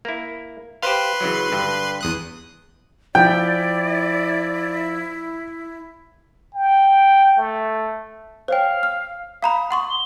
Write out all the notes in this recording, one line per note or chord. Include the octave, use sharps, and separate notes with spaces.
A#3 E4
G4 B4 C5 F5 C6
C#3 E3 F#3
G2 D3
E2 D#6 F#6
F3 E4 D5 G5
G5
A3
C5 C#5 F5 G5
F6
F5 A#5 B5 D#6
F#5 C6 C#6 D#6
G7